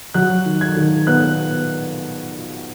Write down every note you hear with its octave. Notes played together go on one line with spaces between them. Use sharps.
F#3 F#6
D#3
G#6
D#3
B3 F#6